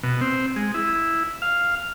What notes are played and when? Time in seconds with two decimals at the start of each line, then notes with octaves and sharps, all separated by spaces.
0.03 B2
0.21 C4
0.56 G#3
0.74 E4
1.42 F5